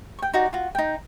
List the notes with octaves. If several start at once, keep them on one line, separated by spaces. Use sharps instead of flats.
G5 C#6
D#4 F#4 D5
F4 F#4
D#4 G5